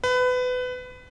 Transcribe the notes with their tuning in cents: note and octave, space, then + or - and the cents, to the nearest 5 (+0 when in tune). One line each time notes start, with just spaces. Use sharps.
B4 +25